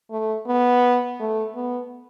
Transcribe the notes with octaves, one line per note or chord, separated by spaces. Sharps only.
A3
B3
A3
B3